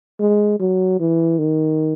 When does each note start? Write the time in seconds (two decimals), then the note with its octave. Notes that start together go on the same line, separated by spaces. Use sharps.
0.20 G#3
0.60 F#3
1.00 E3
1.39 D#3